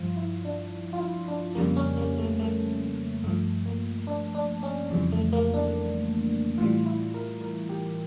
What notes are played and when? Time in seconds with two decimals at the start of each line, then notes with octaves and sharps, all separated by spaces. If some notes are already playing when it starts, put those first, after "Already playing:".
Already playing: G2 F3 F4
0.17 E4
0.45 D4
0.93 F4
1.00 E4
1.28 D4
1.55 F2 C#3 G3 A#3
1.77 C#4
1.97 A#3
2.18 A3
2.39 A3
3.24 G2 F3 A3
3.66 A#3
4.07 D4
4.35 D4
4.63 C#4
4.91 F2 C#3 E3 G3
5.12 A3
5.33 A#3
5.54 D4
6.58 A2 E3 G3 F4
6.86 E4
7.14 A#4
7.41 A#4
7.69 G4